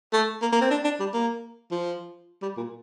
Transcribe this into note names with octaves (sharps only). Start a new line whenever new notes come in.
A3
A#3
A#3
C4
D4
D4
G3
A#3
F3
G3
A#2